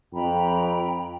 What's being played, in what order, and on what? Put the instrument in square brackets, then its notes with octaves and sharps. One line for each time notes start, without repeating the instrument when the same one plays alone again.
[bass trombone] F2 [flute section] G5 A#5 B5